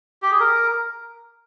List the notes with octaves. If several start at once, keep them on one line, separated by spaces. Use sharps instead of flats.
G4
G#4
A#4